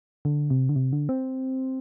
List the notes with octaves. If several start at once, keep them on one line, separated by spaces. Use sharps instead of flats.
D3
C3
D3
C3
D3
C4